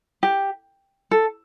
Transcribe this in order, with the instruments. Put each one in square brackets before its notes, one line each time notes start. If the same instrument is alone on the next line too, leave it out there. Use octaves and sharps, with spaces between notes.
[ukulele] G4
A4